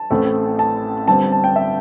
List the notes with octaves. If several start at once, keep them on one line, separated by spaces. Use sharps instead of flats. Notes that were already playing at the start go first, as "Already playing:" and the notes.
Already playing: A5
A1 A2 A3 C4
A5
G1 G2 G3 C4 A5
A5
G5
E5